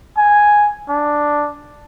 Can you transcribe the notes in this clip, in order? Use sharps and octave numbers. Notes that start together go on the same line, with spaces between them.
G#5
D4